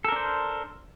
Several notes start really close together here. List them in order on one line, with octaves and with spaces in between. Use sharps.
A4 A#4 D4 C5